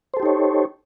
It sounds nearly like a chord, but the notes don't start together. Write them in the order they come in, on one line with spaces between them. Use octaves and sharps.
C5 A4 G4 D#4 C#5